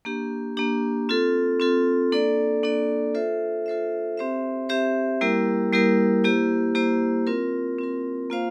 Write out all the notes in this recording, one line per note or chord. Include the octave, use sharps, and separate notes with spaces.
A#3 D4 G4
A#3 D4 G4
C4 F4 A4
C4 F4 A4
A#3 D4 A4 D5
A#3 D4 A4 D5
F4 A4 C5 E5
F4 A4 C5 E5
C4 G4 C5 E5
C4 G4 C5 E5
G3 A#3 E4 G4 A#4
G3 A#3 E4 G4 A#4
A#3 E4 G4 C5
A#3 E4 G4 C5
C4 F4 A#4
C4 F4 A#4
A#3 F4 C5 F5